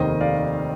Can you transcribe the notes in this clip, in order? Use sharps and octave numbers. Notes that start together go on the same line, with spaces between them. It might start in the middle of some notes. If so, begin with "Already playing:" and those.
Already playing: F1 D#2 D#3 C5 D#5
D5 F5